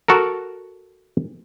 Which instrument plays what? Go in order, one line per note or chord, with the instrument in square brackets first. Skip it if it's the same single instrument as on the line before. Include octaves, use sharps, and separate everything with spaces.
[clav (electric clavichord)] F#4 A4 A#4